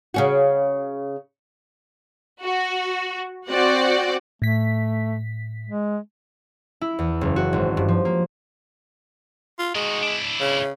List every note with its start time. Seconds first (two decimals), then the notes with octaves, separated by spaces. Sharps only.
0.14 C#3 C#4 F#4
2.42 F#4
3.49 C4 F#4 D5 F#5
4.42 A2 A3 B6
5.67 G#3
6.81 E4
6.99 E2
7.21 F#1
7.36 F#4
7.53 G#1
7.77 G2
7.88 F3
8.05 A#3
9.59 F4
9.75 D#3 G#3 F#4
10.03 D4 E4
10.40 C#3